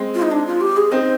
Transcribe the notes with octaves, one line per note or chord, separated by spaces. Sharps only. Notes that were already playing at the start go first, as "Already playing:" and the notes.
Already playing: G#3 C4
F4
D#4
D4
F4
G4
G#4
C4 D#4 C5